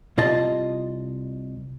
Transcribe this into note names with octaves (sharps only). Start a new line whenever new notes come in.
C2 C3 F4 D#5 A5